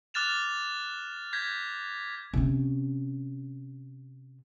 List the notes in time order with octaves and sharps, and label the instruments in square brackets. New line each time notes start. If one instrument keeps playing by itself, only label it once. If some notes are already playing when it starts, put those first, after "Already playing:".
[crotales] D6 F6 F#6 A6 E7 F7
G6 G#6 A#6 B6
[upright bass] C3 C#4